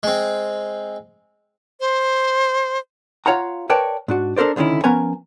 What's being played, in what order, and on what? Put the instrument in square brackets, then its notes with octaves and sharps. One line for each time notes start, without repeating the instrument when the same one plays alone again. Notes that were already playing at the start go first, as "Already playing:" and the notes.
[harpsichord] G#3 C4
[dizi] C5
[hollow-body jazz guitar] F4 C#5 F5 F#5 A#5
A#4 B4 C#5 D5 G5 A5
G#2 D4 F#4
D4 A4 A#4 C5 D5
C#2 D3 D#3 C#4 E4
F3 B3 C#4 A#4 G#5 A#5